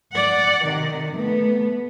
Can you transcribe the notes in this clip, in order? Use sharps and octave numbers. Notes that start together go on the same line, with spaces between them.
D5 F#5
C3 D#3
A3 B3